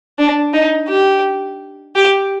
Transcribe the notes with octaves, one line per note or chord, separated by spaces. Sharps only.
D4
D#4
G4
G4